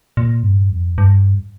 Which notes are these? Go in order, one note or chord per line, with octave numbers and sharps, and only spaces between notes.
A#2
G2
F2
G2